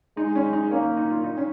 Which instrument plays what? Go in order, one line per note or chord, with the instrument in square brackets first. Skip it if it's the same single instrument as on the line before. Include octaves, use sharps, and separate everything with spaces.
[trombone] G#3 [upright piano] D#4
[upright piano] C#4
D#4
[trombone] A#3 [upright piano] C#4
[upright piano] D#4
F4
D#4
C#4